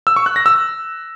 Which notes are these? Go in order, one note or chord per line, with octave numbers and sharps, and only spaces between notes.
E6
C#6
F#6
A#6
E6